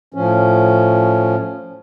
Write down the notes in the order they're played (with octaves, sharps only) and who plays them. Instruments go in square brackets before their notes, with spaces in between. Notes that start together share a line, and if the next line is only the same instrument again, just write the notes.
[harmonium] A2 F3 C#4